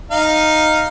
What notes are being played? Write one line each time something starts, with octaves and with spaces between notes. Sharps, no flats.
D#4 F5